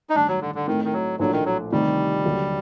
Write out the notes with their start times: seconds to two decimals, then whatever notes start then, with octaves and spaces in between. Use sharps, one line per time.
0.10 D#4
0.15 A1 G2 D#3 D4
0.28 F#3
0.41 D3
0.55 D3
0.67 A2 D#3 A3 C4 D#4
0.85 D#3
0.93 F#3
1.19 A#1 A2 F#3 A3 D4
1.32 D#3
1.46 F#3
1.72 D2 C3 D#3 G3
2.25 D#2 D3 F#3